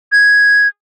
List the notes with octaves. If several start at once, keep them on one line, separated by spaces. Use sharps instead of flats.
G#6